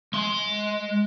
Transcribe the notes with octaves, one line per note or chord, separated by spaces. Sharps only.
G#3 C6